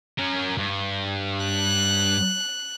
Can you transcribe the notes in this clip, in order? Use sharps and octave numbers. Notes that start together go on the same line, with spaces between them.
C#4 A#4
G2
F#6